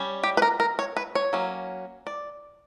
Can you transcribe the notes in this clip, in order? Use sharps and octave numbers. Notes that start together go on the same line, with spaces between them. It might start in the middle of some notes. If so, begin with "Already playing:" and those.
Already playing: G3 C#4
G4
B4
A#4
A#4
C#5
B4
C#5
F#3 A#3 C#4
D5